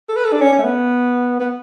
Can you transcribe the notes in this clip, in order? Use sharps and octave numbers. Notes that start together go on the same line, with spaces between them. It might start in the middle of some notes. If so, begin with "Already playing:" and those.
A4
B4
A4
D4
C#4
C#4
A3
B3
B3